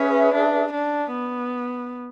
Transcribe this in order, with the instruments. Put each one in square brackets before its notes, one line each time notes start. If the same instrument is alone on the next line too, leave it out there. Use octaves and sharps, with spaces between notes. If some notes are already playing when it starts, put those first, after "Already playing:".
Already playing: [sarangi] C#4 [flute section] G#4 B4 E5
[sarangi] D4
D4
B3